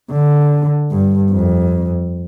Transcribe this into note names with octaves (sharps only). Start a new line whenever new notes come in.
D3
G2
F2